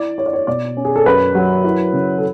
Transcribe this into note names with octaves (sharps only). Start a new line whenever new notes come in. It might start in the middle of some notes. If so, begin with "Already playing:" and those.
Already playing: E4 D5
E4 C#5
D5
C#5
B2 D5
C#4
G#4
A4
F#2 B4
F#3
E4
C#3
A4